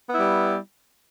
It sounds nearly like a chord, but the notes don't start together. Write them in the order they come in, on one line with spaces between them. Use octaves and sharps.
B3 E4 G3